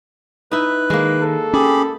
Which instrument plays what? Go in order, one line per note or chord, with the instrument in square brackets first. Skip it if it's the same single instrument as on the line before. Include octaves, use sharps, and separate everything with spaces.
[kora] D#4 E4 [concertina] B4
[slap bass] D#3 [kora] G#3 A#3
[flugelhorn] A4
[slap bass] C#4 [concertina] G4 G#4 B5